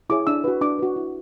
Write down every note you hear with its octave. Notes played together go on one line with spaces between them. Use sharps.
E4 G#4 C#5 D6
D4 E6
F#4 B4
D4 D6
F#4 B4
E4